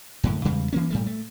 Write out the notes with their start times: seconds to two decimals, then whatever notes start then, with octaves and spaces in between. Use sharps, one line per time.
0.23 F#2 A2 D3
0.45 E2 C#3 G3 G#3
0.73 E3 A#3 C#4
0.90 A2 G3 A3
1.07 A3